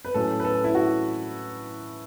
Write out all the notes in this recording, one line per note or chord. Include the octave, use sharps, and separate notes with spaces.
B4
A2 F#3 C#4 A4
B4
A4
E4
F#4